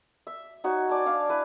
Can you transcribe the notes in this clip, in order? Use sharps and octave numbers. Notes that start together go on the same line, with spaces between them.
E5
D#4 F#4 C#5
D5 G#5 A5
D4 F5
E4 B4